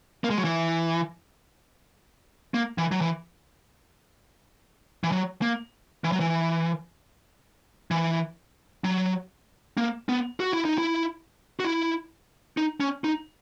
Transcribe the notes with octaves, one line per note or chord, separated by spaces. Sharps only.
A#3
G#3
F#3
E3
A#3
E3
F#3
E3
E3
F#3
A#3
E3
F#3
E3
E3
F#3
A#3
B3
F#4
E4
D#4
E4
F#4
E4
D#4
C#4
D#4